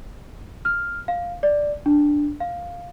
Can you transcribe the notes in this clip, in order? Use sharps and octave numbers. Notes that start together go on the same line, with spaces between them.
F6
F5
D5
D4
F5